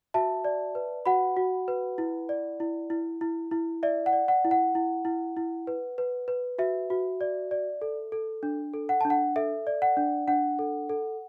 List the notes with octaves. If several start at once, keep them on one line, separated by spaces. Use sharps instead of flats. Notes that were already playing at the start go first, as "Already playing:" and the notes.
F#4 E5 A5
D5
B4
F#4 F#5 B5
F#4
B4
E4
D5
E4
E4
E4
E4
D5 E5
F#5
D5
F#5
E4
F#5
E4
E4
E4
B4
B4
B4
F#4 E5
F#4
D5
D5
A4
A4
D4
A4
F#5
D4 A5
F#5
A4 E5
D5
F#5
D4
D4 F#5
A4
A4